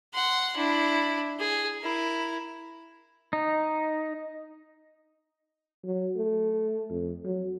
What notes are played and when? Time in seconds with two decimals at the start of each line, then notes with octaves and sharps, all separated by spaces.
0.13 F#5 C6
0.56 D4 E4
1.39 G#4
1.81 E4 A#4
3.33 D#4
5.84 F#3
6.17 A3
6.90 F2
7.24 F#3